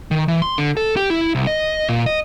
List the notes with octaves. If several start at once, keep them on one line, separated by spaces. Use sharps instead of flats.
D#3
E3
C6
D3
A4
G4
E4
C2
D#5
A#2
D#5